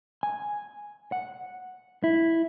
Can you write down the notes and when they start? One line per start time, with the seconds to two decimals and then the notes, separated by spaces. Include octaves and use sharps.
0.23 G#5
1.12 F#5
2.04 E4